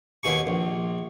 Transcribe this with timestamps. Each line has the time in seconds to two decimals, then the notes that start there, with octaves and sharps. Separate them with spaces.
0.23 D#2 B2 G#4 C#6
0.47 A#1